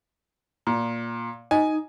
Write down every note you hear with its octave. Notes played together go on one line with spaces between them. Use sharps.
A#2
D#4 D#5 G#5